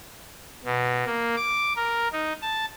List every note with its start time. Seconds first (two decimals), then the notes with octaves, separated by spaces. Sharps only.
0.65 B2
1.06 A#3
1.37 D6
1.76 A#4
2.12 D#4
2.42 A5